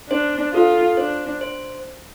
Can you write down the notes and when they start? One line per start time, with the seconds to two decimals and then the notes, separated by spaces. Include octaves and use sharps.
0.10 D4 C5
0.53 F4 A4
0.97 D4 C5
1.41 C5